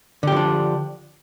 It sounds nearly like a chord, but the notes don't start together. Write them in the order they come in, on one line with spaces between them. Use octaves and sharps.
D3 G4 F3 D4